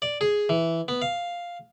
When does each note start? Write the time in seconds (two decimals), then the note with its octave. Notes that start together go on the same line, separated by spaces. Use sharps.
0.02 D5
0.21 G#4
0.49 E3
0.88 B3
1.02 F5